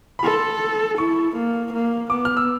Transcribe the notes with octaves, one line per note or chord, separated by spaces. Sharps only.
B5
A4 C6
E4 C#6
A#3
A#3
B3 D6
F6
E6